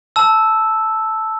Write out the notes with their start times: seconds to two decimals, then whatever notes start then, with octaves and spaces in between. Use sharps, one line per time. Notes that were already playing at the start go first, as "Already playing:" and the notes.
0.16 A5 E6